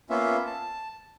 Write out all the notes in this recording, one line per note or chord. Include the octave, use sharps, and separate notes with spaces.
A#3 B3 C#4 F4 E5
A5